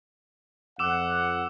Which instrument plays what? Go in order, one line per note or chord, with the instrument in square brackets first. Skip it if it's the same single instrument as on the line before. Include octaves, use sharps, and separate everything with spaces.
[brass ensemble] F2 F#5 [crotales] D6 E6 E7